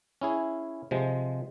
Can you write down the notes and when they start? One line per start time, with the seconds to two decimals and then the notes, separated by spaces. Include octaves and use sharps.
0.21 C#4 E4 G#4
0.91 C3 F3 G#3